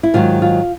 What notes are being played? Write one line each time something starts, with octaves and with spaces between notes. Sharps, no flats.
E4
G#2 D#3 F#3 F4
F4